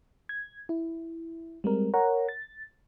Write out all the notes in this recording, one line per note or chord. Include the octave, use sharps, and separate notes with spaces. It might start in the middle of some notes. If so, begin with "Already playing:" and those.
G#6
E4
G3 G#3 C4 A#4
A#4 C#5 F#5 A#5
A6